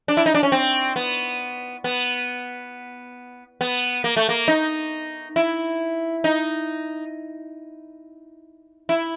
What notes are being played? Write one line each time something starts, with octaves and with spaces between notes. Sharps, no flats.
D4
E4
D#4
D4
C#4
C4
B3
B3
B3
A#3
A3
A#3
D#4
E4
D#4
E4